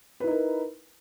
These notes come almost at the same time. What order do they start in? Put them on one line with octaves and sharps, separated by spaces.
B4 E4 D#4 A#4